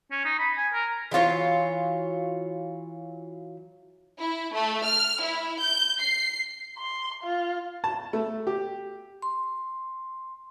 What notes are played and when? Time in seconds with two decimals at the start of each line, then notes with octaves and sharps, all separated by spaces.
0.11 C#4
0.25 D#4
0.39 B5
0.58 G#5
0.73 A#4
1.11 E3 F#3 F4 C#5
4.19 E4
4.53 A3
4.85 F6
5.21 E4
5.60 G6
6.00 C7
6.78 C6
7.23 F4
7.84 A5
8.13 A3
8.47 G4
9.22 C6